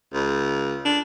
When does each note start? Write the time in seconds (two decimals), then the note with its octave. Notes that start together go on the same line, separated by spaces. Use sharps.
0.13 C#2
0.85 D4